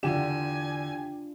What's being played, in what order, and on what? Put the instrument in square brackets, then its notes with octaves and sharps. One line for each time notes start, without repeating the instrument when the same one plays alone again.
[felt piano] E2 D3 E7 [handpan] D4 F4 [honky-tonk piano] G4 [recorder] G#5